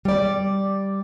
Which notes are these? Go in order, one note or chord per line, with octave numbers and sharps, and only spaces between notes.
G3 D5